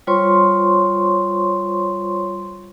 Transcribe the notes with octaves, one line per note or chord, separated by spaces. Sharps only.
G3 F4 C5 C#5 C6 C#6